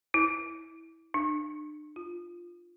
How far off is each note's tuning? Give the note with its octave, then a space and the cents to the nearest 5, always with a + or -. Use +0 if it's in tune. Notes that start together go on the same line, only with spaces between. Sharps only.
E4 -10
D4 +40
F4 +0